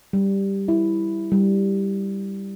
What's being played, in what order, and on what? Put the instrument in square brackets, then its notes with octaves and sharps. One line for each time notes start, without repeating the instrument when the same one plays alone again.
[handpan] G3
E4
G3